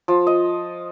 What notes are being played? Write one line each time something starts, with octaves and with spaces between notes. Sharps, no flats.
F3
D#5